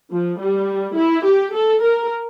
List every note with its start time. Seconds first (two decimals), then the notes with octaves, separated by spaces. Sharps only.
0.12 F3
0.40 G3
0.97 E4
1.25 G4
1.54 A4
1.83 A#4